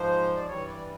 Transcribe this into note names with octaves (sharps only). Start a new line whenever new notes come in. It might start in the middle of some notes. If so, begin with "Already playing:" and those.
Already playing: G#2 F3 C5
D5
G2 E3 G3 C#5
D5